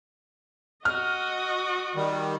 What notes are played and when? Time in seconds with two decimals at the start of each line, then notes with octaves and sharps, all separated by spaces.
0.85 F#4 D#5 F6
1.95 D#3 G3